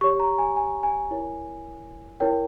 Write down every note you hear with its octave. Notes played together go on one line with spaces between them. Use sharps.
G4 C#5 C#6
A#5
G#5
G#5
G#5
E4 A#4 C#5
E4 A#4 C#5 G5